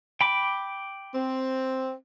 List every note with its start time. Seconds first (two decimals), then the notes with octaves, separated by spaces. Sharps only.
0.21 G5 B5 D6
1.15 C4